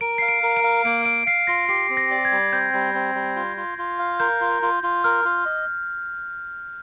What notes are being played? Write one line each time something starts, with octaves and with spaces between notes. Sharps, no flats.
A#4 D7
F5 C7
D7
A#4
D7
F5
A#3 D7
F5 D7
F5 C7
F4 A#6
G4 C7
C4
A#6
D5
G#6
G3
C4 G6
G3
C4
G3
F4
F4
F4
F5
A#4 G6
F4
F4
F4
A#4 F6
F4
D#5